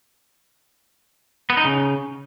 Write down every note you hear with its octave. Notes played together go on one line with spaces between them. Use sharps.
B3
D#4
C#3